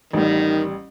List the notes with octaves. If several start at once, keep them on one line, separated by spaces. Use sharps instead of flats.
A1 D#3 G3